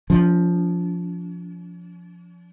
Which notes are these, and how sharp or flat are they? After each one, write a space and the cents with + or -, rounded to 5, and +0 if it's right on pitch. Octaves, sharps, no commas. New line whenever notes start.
F3 +0 D4 -45